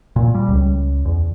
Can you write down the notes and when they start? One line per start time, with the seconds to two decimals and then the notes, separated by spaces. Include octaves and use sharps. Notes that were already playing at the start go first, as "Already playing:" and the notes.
0.16 A#2
0.35 G3
0.49 C#2
1.05 E2